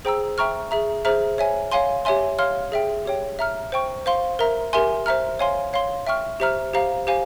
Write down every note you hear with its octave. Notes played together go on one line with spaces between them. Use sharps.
G#4 C5 G5 A#5 E6
E5 G5 A#5 C#6 F6
G#4 E5 A#5
G#4 C5 E5 A#5 F6
C#5 E5 G#5
C#5 F5 G#5 C6
G4 C#5 E5 G#5 C6
C#5 F5 C6 F6
G#4 E5 G5
G4 C#5 G5
E5 A#5 F6
C5 G5 C#6
C5 F5 C6
A#4 E5 A#5
G4 A#4 E5 G#5 C6
C5 E5 A#5 F6
C#5 F5 G#5 C6
C#5 F5 C6
E5 G5 C#6 F6
G4 C5 E5 A#5 F6
G4 C5 F5 A#5
G4 C5 F5 G#5